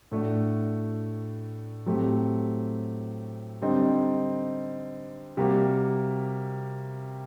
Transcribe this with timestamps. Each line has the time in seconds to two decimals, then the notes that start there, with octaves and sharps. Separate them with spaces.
0.12 A2 A3 D4 F#4
1.86 A2 F#3 A3 C4 G4
3.62 D3 G3 C4 D#4
5.37 C3 G3 A#3 F#4